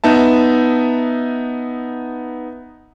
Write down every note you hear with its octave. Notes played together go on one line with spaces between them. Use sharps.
B3 D#4 E5 A5